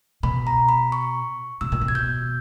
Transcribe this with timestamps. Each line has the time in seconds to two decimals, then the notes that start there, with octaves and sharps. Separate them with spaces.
0.23 B2 B5
0.47 A#5
0.69 B5
0.92 C#6
1.61 B2 E6
1.72 A#2
1.81 B2
1.88 G#6
1.95 G6